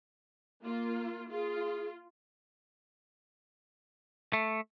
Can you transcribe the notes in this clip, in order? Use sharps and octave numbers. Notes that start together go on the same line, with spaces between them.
A#3 F4
F4 G#4
A3